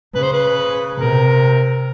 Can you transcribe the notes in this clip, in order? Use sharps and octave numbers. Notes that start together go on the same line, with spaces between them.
C#3 B4
C5
B4
C3 A#4